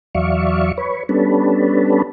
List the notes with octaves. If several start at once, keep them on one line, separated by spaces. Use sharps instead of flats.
E2 F#3 D5 E5 F5 C#6
B4 C#5
G3 B3 C#4 D4 A4 B4